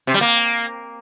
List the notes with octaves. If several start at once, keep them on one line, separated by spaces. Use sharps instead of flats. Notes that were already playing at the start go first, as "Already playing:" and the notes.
C3
G3
A#3